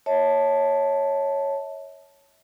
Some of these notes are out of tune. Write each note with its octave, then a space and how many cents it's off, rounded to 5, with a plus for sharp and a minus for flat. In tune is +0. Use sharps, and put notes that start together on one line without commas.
C#5 +0 E5 -35 A5 +0